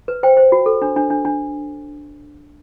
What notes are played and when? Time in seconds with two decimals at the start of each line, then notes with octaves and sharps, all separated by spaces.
0.08 B4
0.23 C5 G5
0.37 C5
0.52 F#4
0.66 A4
0.82 D4
0.96 D4
1.10 D4
1.25 D4